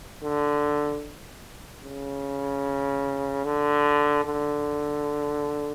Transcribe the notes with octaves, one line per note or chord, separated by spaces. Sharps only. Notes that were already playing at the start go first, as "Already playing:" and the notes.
D3
C#3
D3
D3